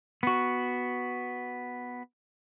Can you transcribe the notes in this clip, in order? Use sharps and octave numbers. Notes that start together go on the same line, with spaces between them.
B3 F#4